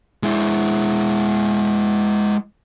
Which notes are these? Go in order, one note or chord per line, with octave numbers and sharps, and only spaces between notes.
G#3 E4